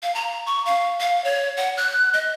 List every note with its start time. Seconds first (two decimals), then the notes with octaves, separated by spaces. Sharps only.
0.03 F5
0.15 A#5
0.46 C#6
0.66 F5
1.00 F5
1.24 C#5
1.57 F#5
1.77 F#6
2.13 D#5